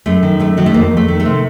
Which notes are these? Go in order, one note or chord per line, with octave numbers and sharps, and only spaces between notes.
F#2 A3
D#3
F#2 A3
D#3 F#3
A3
F2 A#3
F2
A3
D#3
A3
C3